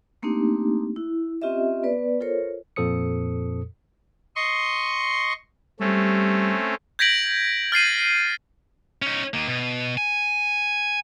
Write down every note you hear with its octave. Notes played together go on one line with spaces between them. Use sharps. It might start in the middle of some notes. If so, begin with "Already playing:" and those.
A3 A#3 C4 D4 D#4 G4
E4
C4 C#4 F4 G4 D#5 E5
B3 B4 D5
F4 A4 A#4 C5 C#5
F2 A#2 A4 C5 D#6 C#7
D#5 C6 C#6
G3 A3 C4 C#4
G6 G#6 A#6 B6 D7 F#7
F6 A6 C7 D#7
C#4 D#4
D#3 A#3
B2
G#5